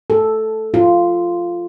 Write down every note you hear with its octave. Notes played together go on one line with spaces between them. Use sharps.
A4
F4